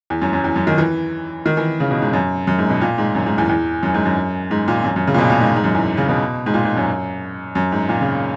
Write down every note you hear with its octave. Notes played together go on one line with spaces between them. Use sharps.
E2
F#2
F#2
E2
F#2
D#3
E3
D#3
E3
C#3
B2
G#2
F#2
F#2
G#2
B2
A#2
G#2
F#2
G#2
E2
E2
F#2
G#2
F#2
G#2
A#2
F#2
F#2
C#3
A#2
B2
A#2
G#2
G#2
F#2
E2
C#3
B2
G#2
A#2
G#2
F#2
F#2
G#2
A#2
C#3